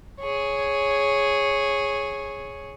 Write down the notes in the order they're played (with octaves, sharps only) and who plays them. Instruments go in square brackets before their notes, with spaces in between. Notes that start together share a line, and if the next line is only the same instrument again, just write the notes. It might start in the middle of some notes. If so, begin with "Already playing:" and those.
[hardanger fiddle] G#4 C#5